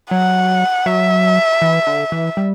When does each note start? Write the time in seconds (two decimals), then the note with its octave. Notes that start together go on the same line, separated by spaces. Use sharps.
0.11 F#3 F#5
0.86 F#3 E5
1.62 E3
1.87 D3
2.12 E3
2.37 G3